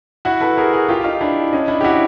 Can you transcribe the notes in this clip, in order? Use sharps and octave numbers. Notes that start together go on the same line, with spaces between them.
E4 F#4
A4 B4
G#4 A#4
F#4 G#4
F4 G4
D#4 F4
D4 E4
C#4 D#4
D4 E4
G4
E4 F#4